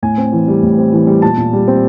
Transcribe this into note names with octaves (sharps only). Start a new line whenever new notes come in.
A2 G#5
C4
E3
G3
A2
C4
E3
G3
A#2 A5
A#2
G3
C4